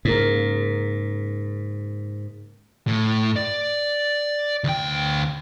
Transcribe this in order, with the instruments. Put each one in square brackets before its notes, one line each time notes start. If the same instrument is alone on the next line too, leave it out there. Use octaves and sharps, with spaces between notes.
[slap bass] G#2 [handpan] C#3 A#3 A#4
[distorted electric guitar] A2
D5
D2 G5